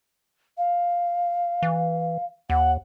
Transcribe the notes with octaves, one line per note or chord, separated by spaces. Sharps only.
F5
E3
D#2 F#5